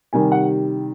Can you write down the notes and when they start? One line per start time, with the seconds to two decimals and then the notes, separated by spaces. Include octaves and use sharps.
0.13 C3 D#3 G3 G#5
0.32 F#5